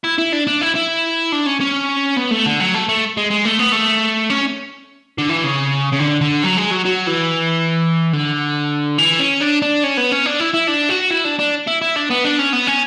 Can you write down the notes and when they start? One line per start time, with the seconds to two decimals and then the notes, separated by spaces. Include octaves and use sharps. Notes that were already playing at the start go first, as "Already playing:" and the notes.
0.04 E4
0.19 E4
0.33 D4
0.47 D4
0.61 E4
0.75 E4
1.32 D4
1.47 C#4
1.61 C#4
2.17 B3
2.31 A3
2.46 D3
2.60 F#3
2.74 A3
2.89 A3
3.17 G#3
3.31 G#3
3.45 A3
3.59 B3
3.72 A3
4.30 C#4
5.18 D3
5.29 E3
5.44 C#3
5.93 C#3
6.00 D3
6.21 D3
6.43 F#3
6.57 G#3
6.71 F#3
6.85 F#3
7.07 E3
8.13 D3
8.98 E3
9.19 C#4
9.40 D4
9.62 D4
9.84 C#4
9.97 B3
10.12 C#4
10.26 D4
10.40 E4
10.54 E4
10.68 D4
10.90 F#4
11.11 E4
11.25 D4
11.39 D4
11.67 E4
11.82 E4
11.96 D4
12.10 B3
12.24 D4
12.39 C#4
12.53 B3
12.67 C#4